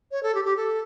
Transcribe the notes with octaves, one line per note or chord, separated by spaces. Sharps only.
C#5
A4
G4
G4
A4